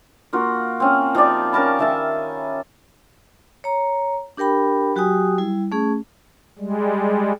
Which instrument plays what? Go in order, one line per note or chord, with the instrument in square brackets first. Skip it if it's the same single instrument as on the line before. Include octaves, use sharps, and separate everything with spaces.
[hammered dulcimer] A#3 F4 F#4
C4 C#4
F3 D#4 G4 D5
C#4 A#4 A5 B5
D#3 E5 A5
[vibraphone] C#5 A#5
D4 G4 A#4 G5 B5
F#3 F#4 G4 G5 G#5 D#6
G3 E4
A3 C#4 G#4
[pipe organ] G3 G#3